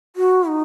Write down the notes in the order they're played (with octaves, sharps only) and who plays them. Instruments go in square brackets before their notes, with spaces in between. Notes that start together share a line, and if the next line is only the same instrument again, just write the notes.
[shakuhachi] F#4
D#4